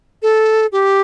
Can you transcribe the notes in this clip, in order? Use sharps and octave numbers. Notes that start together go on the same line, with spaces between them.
A4
G4